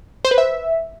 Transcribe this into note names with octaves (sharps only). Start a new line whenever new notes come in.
C5
B4
E5